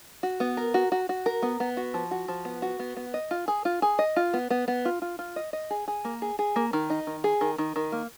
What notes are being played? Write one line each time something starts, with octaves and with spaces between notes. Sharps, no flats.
F#4
B3
A#4
F#4
F#4
F#4
A#4
B3
B3
F#4
F3
F#4
F3
B3
F#4
B3
B3
D#5
F4
G#4
F4
G#4
D#5
F4
B3
B3
B3
F4
F4
F4
D#5
D#5
G#4
G#4
A#3
G#4
G#4
A#3
D#3
D#4
D#3
G#4
D#3
D#3
D#3
A#3